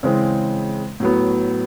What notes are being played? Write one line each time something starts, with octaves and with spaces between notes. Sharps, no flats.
C#3 E3 G#3 C4
A2 F#3 B3